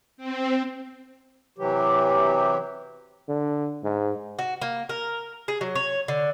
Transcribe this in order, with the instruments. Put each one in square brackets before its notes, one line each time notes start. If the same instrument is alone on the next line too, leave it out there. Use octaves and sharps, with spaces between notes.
[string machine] C4
[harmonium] C3 E3 F#3 G4
[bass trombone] D3
G#2
[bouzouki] F#4
A#3
A#4
G#4
F#3
C#5
D3